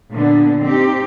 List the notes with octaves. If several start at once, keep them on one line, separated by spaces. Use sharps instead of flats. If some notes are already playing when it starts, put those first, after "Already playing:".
A#2 D3 B3 D4
C4 D#4 G4